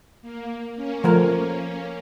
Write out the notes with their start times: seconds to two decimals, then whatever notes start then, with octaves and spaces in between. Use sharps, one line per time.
0.22 A#3
0.74 A#3 C#4
1.04 F3 A3 A#4